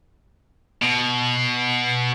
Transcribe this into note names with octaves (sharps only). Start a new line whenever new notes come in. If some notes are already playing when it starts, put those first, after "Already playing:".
B2